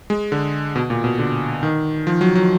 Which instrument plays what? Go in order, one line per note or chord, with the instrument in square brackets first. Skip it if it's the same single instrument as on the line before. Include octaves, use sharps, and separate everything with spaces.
[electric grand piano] G#3
D3
B2
A#2
B2
D3
D#3
F3
F#3
F#3